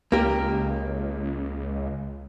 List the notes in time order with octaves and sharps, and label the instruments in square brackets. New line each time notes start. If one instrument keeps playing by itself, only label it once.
[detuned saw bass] C#2 [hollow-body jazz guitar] A#3 G4 A#4